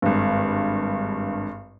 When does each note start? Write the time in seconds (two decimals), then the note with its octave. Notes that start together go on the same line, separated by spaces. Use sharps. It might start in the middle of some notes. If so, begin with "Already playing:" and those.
0.02 G#1 G2